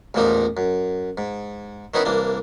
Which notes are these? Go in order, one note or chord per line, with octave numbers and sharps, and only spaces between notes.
A1 E2 A#2 F3 A#3 D#4
F#2
G#2
D#3 B3 C#4 D#4 E4 B4
C2 E3 A#3 D4